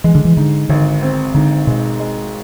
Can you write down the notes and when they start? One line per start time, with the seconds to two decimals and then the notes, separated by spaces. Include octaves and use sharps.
0.04 E3 G#3
0.15 D3
0.25 E3
0.37 G#2 D3
0.69 G#1 D3
1.02 C4
1.34 G#2 D3
1.67 B2 G#3
2.00 G#3